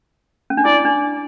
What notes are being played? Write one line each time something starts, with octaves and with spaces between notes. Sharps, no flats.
C#4
D4
E4 D5
D4